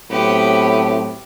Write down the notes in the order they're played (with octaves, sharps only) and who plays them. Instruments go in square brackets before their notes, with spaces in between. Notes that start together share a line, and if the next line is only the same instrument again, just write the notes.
[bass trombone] A2 [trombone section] F#3 C4 [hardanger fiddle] B3 G4